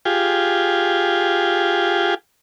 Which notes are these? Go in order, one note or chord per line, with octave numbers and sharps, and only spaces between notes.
F4 G4 G#4